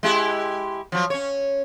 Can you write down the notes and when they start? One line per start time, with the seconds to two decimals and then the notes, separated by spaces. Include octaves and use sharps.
0.03 G#3 E4 G4
0.92 F3 F#3
1.10 C#4 C#5